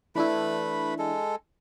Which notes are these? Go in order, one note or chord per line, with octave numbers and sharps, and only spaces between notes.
E3 A3 D4 E4 B4 B5
G#3 A4